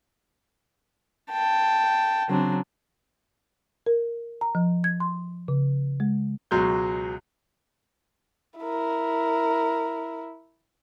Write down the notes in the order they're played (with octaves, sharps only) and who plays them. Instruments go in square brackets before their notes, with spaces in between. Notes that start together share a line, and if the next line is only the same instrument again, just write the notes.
[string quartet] G5 A5
C#3 F#3 C4 D4
[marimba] A#4
A#5
F3
G#6
C6
C#3
G#3
[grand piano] C#2 B2 F#3 G#3 G6
[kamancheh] E4 A#4